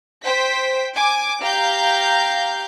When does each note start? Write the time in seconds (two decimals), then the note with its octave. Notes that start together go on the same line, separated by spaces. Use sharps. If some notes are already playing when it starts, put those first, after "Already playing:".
0.24 C5 G5 B6
0.95 G#5 D6
1.41 G4 F5 A#5 G6